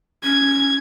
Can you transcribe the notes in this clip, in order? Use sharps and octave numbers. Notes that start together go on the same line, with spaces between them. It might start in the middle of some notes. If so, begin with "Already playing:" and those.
C#4 G#6